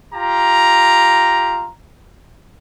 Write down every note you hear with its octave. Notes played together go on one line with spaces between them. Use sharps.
F4 G4 A#5